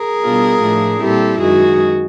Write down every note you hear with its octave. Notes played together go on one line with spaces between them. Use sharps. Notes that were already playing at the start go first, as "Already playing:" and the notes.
Already playing: G#4 A#4
B2 G3 B3 D4 F4
A2 F3 A3 D4
A#2 G3 C4 E4 G4 A4
F#2 D#3 G#3 F#4 G#4